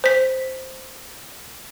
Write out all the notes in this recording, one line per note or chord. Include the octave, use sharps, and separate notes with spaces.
C5 B6